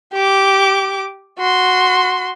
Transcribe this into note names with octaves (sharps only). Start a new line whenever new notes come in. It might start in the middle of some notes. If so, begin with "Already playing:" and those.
G4 D6
F#4 C6